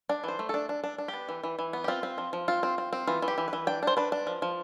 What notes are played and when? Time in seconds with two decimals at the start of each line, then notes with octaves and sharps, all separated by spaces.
0.09 D4 D5
0.24 E3 C5
0.39 A3
0.49 D4 A4
0.69 D4
0.84 D4
0.98 D4
1.08 G4
1.13 B3
1.29 E3
1.43 E3
1.59 E3
1.73 B3
1.84 G4
1.88 C4 F4
2.03 C4
2.18 F3
2.33 F3
2.48 C4 F4
2.63 C4
2.78 C4
2.93 C4
3.07 E3 F4
3.22 E3
3.28 G4
3.38 E3
3.48 B4
3.53 E3
3.67 D4 G5
3.83 D4 C5
3.97 D4 B4
4.12 D4
4.27 F3
4.42 F3